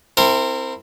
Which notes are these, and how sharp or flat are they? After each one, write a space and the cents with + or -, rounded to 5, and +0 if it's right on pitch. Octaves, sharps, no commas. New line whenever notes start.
C4 +0 E4 +0 A#4 -30